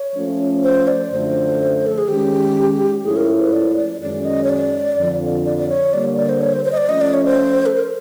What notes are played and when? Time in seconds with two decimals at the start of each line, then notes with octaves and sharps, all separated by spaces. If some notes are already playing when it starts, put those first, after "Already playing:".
Already playing: C#5
0.16 F3 A3 C#4
0.64 C5
0.87 D5
1.11 F#2 D3 F3 A3 D4 C5
1.86 A4
1.98 G#4
2.08 D#3 G#3 C#4 G4
3.04 G#2 F3 A3 C#4 E4 G#4
3.16 A#4
3.40 B4
3.52 D5
3.76 D5
4.01 F#2 D#3 G#3 C#4 D5
4.25 D#5
4.44 C#5
4.49 D5
4.97 F2 D3 F3
5.45 D5
5.58 D5
5.69 C#5
5.93 D3 G3 A#3 D5
6.17 D5
6.29 C5
6.41 C#5
6.53 C5
6.65 C5
6.72 D#5
6.77 D5
6.89 F3 A3 C#4 D#5
7.01 D5
7.14 C#5
7.25 C5
7.66 A4
7.75 A#4